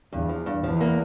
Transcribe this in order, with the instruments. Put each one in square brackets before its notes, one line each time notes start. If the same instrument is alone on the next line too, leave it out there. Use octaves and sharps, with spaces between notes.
[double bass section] E2 [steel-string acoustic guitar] G2
[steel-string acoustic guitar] F3
G2
[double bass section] E2 [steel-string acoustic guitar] F3
[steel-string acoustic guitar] A#3